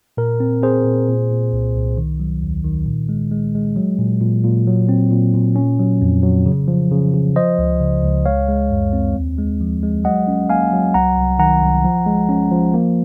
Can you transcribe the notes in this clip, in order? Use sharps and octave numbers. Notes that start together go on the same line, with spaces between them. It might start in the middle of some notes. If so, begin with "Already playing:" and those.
A#2 A#4
C4
C4 G#4 C5
A#2
A#2
A#2
C2
C2
D#3
F#3
D#2
D#3
A#2
G#3
G#3
G#3
F#3
A#2
A#2
A#2
F#3
C4
A#2
A#2
C#4
F#3
F2
F#3
C#3
F3
C#3
C#3
F3 C5 D#5
C#2
C#3
C#2
G#3 C#5 F5
G#3
F#2
C4
D#2
G#3
F3
G#3
F#3 D#5 F#5
C#4
A#3 F5 G#5
F#3
C2 F#5 A#5
C2
D#3 F#5 A#5
C2
F3
G#3
C#4
F3
A#3